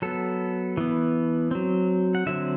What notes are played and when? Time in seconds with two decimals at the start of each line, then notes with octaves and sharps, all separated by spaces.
0.02 F#3 B3 A4
0.77 E3 B3
1.51 F#3 C4
2.15 F#5
2.26 D3 F#3 C4 E5